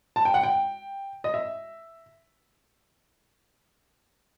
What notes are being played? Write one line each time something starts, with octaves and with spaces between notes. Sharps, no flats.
A5
G5
F#5
G5
D#5
E5